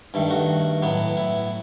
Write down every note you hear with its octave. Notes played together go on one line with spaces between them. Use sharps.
G2 D#3 A3
F#4
A2 F#3 B3
E4